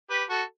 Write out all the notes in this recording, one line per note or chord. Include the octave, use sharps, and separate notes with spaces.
G4 B4
F#4 A4